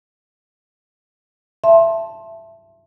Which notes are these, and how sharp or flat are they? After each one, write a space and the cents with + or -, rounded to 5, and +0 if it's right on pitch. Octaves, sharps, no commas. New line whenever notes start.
E5 +15 A5 +0 C6 +25